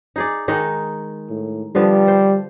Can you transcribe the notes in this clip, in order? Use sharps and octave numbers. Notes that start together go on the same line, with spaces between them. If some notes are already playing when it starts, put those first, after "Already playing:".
D#4 G#4 D5
D#3 G#3 D#4
A2
D3 F3 G3 B3
C5